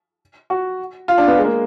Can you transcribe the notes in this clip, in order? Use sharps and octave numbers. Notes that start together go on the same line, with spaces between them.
F#4
F4
D4
B3
G#3
A#3